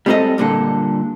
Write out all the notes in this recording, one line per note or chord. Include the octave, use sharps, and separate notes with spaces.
G3 G#3 C4 G4 A4 D#5
G2 A#2 D3 A4